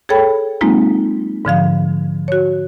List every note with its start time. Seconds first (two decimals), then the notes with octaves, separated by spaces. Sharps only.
0.09 G#4 A4 C#5 G5 B5
0.61 F#3 G#3 A#3 C4 D#4 F4
1.45 G#2 D3 F3 F5
2.28 F#4 C#5